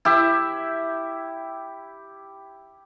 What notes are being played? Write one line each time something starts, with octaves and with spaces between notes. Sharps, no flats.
E4 G4 E5